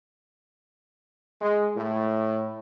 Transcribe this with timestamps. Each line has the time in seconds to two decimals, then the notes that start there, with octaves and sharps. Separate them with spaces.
1.41 G#3
1.76 A2